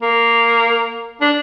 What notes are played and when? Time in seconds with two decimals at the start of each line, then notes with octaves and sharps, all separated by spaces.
0.02 A#3
1.21 D4